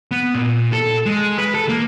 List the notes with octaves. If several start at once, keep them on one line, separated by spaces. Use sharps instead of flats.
B3
A#2
A4
G#3
B4
A4
A#3